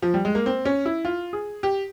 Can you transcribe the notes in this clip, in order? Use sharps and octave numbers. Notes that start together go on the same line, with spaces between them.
F3
G3
G#3
A#3
C4
C#4
E4
F4
G#4
G4